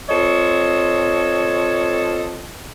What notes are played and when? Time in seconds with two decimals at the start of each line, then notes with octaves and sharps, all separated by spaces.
0.09 C4 F4 A4 C#5 D#5